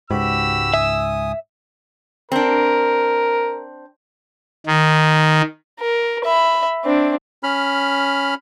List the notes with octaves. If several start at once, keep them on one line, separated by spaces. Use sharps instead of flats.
C#2 G#2 F#4 G4 B5 E6
E5 G#5 D#6
C4 D4 A#4
D#3
A#4
E5 B5
C4 D4
C#4 B5 F6